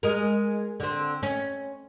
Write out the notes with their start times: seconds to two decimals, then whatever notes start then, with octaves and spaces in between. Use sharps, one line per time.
0.03 G#3 A#4
0.80 D3 C4
1.23 C#4